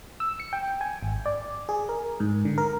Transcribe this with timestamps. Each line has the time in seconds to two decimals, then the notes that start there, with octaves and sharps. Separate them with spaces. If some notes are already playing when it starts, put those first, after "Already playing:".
0.20 E6
0.40 C#7
0.53 G5
0.81 G#5
1.02 G#1
1.26 D5
1.69 G#4
1.89 A#4
2.20 G#2
2.45 D3
2.58 A#4